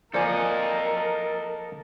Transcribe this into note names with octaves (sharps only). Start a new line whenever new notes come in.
F3 A#3 A4 A#4 C5 D5 D#5 G#5